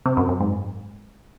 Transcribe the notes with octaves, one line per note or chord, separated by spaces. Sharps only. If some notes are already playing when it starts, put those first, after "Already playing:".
C3
F#2
F#2
G#2